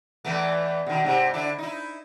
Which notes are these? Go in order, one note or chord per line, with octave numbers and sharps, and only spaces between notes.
E2 E3 A3
B2 D#3
G#2 C3
D3 D4 E4
D#4 E4